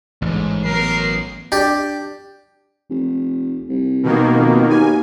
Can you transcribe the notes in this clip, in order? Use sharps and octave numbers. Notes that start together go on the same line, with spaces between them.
A1 D#2 G#2
F#3 B3 A#4 C7
D4 G4
F1
C2
B2 D#3 A#3
F2
D#2 G#5